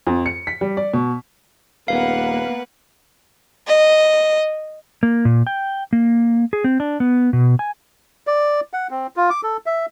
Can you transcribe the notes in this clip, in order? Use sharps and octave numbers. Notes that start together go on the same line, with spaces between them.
F2
C#7
B6
G3
D5
B2
D#1 A#3 B3 B4 F5 F#5
D#5
A#3
A#2
G5
A#3
G#4
C4
D4
B3
B2
G#5
D5
F#5
C4
F4
D6
A4
E5